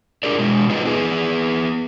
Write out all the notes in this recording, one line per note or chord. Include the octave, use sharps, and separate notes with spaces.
D4 F4 G4 G#4 A#4 D5
B2 G#3
B3 D#4 F4 G#4 B4 D#5
B3 G#4 B4